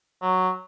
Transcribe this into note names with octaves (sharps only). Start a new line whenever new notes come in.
F#3